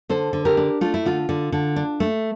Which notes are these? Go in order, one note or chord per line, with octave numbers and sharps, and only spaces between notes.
D3 A4 C5
D3
G4 A#4
D4
A3 F4
E4
D3 F4
D3
D3
D4
A3